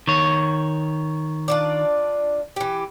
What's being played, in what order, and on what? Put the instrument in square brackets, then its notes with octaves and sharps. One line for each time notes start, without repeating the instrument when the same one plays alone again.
[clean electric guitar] D#3 C#5
[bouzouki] D4 F4 D5
E3 G4